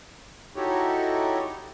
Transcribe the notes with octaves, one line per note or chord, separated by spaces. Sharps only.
D#4 E4 F#4 G4 A4 C#5